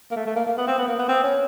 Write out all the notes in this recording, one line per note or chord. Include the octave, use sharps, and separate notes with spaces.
A#3
A3
A3
A#3
A#3
B3
C4
B3
A#3
B3
C4
C#4